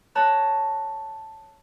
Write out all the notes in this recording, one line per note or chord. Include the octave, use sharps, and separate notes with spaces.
C#5 A5 A#5 F#6